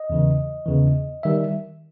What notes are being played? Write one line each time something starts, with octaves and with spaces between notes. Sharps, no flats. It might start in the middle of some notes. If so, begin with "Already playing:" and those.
Already playing: D#5
E2 C#3 E3
E2 C#3 E3
D#3 G3 E5